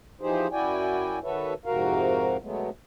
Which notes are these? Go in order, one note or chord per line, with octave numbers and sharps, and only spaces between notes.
E3 F3 D#4 G4 G#4 C5
F#2 E4 F#4 D5 G5 G#5
D#3 F#4 A4 B4 C#5 E5
F2 G#2 C3 F#4 A#4 F5
F#2 B2 F#3 G#3 A3 B3